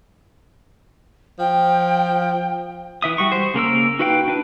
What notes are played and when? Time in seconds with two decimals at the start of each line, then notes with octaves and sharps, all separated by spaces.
1.39 F3 G5
3.02 E3 E5 D#6
3.18 G3 F#4 C#6
3.32 C5
3.54 C#3 A#3 A#4 E6
3.99 D#4 F#4 B4 F5 G5
4.28 D4 E4 B4